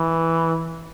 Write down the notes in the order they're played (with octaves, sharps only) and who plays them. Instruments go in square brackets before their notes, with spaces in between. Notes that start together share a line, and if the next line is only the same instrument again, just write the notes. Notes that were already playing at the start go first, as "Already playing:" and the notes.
Already playing: [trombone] E3